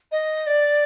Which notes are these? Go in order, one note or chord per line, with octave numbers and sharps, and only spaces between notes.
D#5
D5